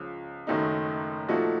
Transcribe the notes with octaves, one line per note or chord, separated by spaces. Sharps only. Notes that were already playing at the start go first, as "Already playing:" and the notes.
Already playing: C#2 C#3 F3
F#1 F#2 D#3 A3 D#4
A#2 F3 A3 D#4 F#4